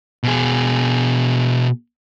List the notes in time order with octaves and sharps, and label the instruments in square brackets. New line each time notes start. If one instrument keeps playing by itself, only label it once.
[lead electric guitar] B2 G#4